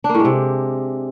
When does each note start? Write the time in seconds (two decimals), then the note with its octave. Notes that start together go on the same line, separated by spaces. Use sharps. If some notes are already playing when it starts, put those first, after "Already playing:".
0.04 D4
0.09 A#3
0.15 A2
0.20 G#3
0.25 C3